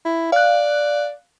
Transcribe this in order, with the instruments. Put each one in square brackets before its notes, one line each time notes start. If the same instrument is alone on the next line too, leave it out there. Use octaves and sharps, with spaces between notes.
[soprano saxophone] E4
[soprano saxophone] D5 [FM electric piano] F5 F#6